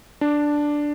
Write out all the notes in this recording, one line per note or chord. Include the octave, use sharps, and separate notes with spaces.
D4